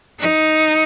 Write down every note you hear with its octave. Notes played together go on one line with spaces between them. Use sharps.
D#4